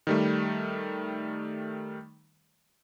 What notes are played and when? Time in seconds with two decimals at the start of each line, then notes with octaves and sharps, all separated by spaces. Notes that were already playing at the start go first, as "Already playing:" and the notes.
0.07 D#3 G3 A3